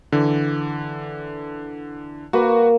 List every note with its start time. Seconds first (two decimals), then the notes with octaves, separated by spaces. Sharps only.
0.12 D3 E3
2.33 A#3 F#4 B4